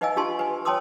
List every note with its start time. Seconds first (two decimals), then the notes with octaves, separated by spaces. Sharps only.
0.01 D#4 B4 D#5 F5 G#5 E6
0.16 D4 F4 G4 G#5 A5 C6
0.39 B4 G#5
0.65 C#5 G5 A5 C6 D#6 E6